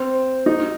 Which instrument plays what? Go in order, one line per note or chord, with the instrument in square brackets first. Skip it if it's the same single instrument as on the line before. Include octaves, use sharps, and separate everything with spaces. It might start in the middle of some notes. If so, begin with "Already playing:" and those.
Already playing: [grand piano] C4
D#4